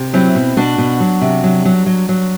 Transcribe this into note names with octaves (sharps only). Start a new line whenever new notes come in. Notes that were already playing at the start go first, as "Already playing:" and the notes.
Already playing: C3
F#3 C4 E4
B2
B2 D4 F#4
B2
F#3
C3
F#3
F#3
F#3
F#3